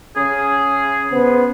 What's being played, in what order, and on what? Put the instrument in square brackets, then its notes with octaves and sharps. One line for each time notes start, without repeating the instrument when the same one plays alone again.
[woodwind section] C#3 C#4 G#4
[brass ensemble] C#3 B3 C5